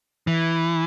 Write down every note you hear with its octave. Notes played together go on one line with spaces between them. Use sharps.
E3